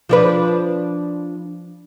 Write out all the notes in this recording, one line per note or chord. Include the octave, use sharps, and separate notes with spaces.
F3 D4 B4